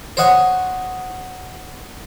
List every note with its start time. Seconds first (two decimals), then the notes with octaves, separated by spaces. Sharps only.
0.17 C5 C#5 D#5 F#5 C#6